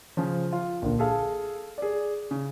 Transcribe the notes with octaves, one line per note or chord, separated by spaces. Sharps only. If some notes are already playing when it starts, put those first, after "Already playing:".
C#3 F3
F4
A#1 D3
G#4 A4 F5
G#4 D5
C#3